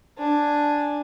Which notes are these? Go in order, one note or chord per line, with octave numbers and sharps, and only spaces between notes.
D4 G#5